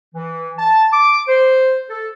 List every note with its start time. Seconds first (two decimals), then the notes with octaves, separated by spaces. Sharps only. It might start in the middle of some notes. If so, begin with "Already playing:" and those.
0.15 E3
0.58 A5
0.93 D6
1.28 C5
1.89 A4